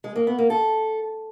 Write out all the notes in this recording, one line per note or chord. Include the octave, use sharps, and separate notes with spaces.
G#3
A#3
B3
A#3
A4